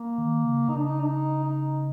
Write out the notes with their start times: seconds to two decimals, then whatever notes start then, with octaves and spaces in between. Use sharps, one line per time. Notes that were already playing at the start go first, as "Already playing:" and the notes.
Already playing: A#3
0.18 D#3
0.44 C#3
0.68 C#3 D#4
0.76 D4
0.84 D#4
1.00 D4
1.06 D#4
1.43 D#4